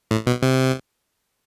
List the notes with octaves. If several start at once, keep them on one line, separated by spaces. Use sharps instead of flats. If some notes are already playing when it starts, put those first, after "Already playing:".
A2
B2
C3